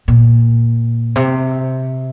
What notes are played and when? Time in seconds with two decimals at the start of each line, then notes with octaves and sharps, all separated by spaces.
0.08 A#2
1.16 C3